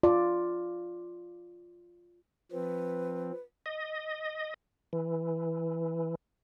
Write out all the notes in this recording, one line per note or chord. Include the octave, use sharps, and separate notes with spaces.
F4 D5
F3 C4 B4
D#5
E3